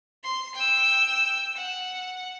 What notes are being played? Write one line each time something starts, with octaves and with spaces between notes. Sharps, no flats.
C6
G5 E6
F#5